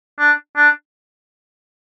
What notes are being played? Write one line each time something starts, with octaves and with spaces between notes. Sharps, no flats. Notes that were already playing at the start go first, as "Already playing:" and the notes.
D4
D4